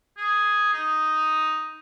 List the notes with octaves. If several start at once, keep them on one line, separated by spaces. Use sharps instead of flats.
G#4
D#4